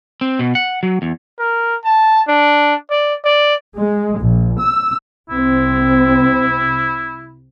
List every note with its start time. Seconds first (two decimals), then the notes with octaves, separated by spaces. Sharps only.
0.21 C4
0.39 B2
0.55 F#5
0.83 F#3
1.02 E2
1.39 A#4
1.84 A5
2.28 D4
2.90 D5
3.25 D5
3.78 G#3
4.20 A#1
4.62 E6
5.30 C2 C4 E4